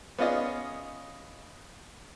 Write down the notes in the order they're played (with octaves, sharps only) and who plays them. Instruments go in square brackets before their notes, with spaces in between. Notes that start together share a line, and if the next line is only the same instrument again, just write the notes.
[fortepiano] B3 C#4 F4 G#4 D5 D#5